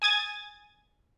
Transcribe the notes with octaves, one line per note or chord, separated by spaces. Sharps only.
G#5 D#6 G#6 A6